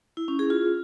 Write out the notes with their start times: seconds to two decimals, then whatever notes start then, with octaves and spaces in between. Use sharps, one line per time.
0.17 E4
0.28 C#4
0.39 G#4
0.50 F4